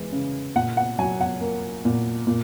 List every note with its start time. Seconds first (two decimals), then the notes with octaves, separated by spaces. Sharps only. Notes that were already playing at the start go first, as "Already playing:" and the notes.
Already playing: E3 G#3
0.12 C#3
0.55 A#2 F#5
0.77 F#5
0.99 F#3 G#5
1.21 F#5
1.41 A#3
1.85 A#2
2.27 A#2